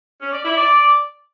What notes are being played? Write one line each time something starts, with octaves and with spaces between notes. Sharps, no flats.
C#4
D5
E4
D5